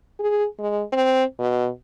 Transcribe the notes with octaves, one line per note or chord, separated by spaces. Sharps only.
G#4
G#3
C4
B2